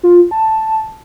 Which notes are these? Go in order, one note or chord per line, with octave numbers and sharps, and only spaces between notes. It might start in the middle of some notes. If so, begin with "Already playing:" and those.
F4
A5